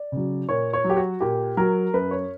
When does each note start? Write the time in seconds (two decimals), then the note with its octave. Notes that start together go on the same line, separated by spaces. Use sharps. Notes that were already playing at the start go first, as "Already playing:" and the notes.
Already playing: D5
0.12 C#3 F#3
0.49 A#2 C#5
0.73 C#5
0.84 F#3
0.90 G4
0.97 F#4
1.20 A#2 G4
1.57 F#3 A#4
1.94 F#2 B4
2.11 C#5